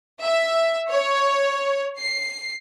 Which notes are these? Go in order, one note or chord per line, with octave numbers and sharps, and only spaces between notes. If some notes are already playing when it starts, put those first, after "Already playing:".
E5
C#5
C7